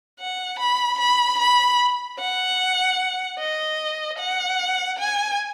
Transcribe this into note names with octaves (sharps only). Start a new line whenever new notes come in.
F#5
B5
B5
B5
F#5
D#5
F#5
G#5